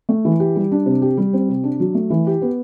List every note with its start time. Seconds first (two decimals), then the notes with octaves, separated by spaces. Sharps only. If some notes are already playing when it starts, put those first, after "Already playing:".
0.09 A3
0.25 E3
0.40 G4
0.56 G3
0.72 D4
0.86 C3
1.02 G4
1.17 G3
1.33 C4
1.49 C3
1.64 D4
1.80 F#3
1.95 A3
2.10 E3
2.27 G4
2.42 B3